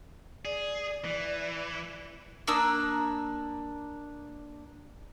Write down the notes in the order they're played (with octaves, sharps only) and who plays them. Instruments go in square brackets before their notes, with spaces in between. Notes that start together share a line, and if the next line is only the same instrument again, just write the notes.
[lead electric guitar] G#4 [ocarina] D5
[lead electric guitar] E3
[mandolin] A#3 D4 D#6 E6